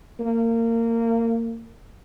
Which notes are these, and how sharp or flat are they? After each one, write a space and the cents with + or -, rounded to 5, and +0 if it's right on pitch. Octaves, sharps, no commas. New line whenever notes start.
A#3 -25